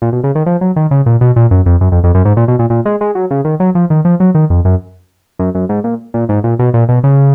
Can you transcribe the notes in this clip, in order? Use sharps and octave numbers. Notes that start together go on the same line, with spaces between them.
A#2
B2
C#3
D#3
F3
F#3
D#3
C#3
A#2
B2
A#2
F#2
F2
F#2
F2
F2
F#2
G#2
A#2
B2
A#2
A#2
G#3
G#3
F#3
C#3
D#3
F#3
F3
D#3
F3
F#3
D#3
F2
F#2
F#2
F#2
G#2
A#2
A#2
G#2
A#2
B2
A#2
B2
C#3